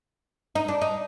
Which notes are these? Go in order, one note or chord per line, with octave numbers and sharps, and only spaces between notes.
D#4
D4
D#4